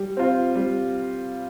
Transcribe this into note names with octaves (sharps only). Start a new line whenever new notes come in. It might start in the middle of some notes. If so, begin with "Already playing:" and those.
Already playing: G3
C4 F4
G3